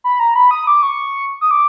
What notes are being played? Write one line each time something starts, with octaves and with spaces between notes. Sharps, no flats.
B5
A#5
B5
D#6
D6
C#6
D#6
D6